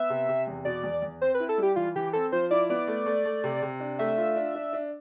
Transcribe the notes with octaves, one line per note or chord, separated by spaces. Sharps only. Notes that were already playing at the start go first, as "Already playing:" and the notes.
Already playing: B3 E5
C3
C3
E2
B2 D5
E2
E2
C4 C5
B4
E4
A4
G3 G4
E3 F4
E3 G4
C4 A4
F3 C5
E4 D5
B3 D5
A3
A3
A3
C3
C3
D4
A3 E5
F4
D4
D4
D4